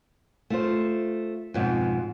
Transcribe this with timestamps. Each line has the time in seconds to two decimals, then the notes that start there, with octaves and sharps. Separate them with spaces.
0.50 A3 F4 C5
1.54 F2 G#2 B2